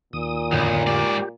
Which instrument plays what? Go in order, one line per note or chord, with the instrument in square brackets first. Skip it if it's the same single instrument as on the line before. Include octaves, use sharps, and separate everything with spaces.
[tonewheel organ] D#2 D#6 [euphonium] A#2
[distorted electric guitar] B1 [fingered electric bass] F2 A2 D3
[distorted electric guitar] G#2 D5 [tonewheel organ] G4